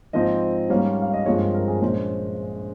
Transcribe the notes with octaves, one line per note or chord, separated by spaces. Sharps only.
G#2 F3 C4 D#5
G#2 G3 A#3 C#4
F5
D#5
G2 F3 G#3 C4 C#5
A#4
A#4
G#4
A#1 A#2 G#3 C#4 C5